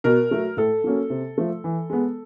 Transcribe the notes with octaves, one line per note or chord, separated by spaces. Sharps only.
B2 A#4
F#3 A3
A2 A4
F#3 A#3 C#4
C3
F3 A3
E3
G#3 B3